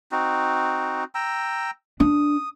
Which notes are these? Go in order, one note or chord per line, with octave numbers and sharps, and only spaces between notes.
C4 D#4 F#4
G5 A#5 E6
D4 D#6